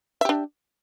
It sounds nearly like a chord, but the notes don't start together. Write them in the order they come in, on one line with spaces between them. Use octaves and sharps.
E5 G4 D4